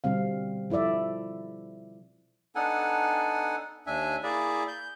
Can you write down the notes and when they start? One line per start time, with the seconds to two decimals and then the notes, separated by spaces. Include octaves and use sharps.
0.04 B2 D3 G3 C4 F5
0.70 F3 E4 A4 D5 E5
2.55 B3 D4 D#4 A4 F#5 G#5
3.87 D#2 D4 E5 G#5
4.23 A#3 E4 G#4 D5 E5
4.68 G6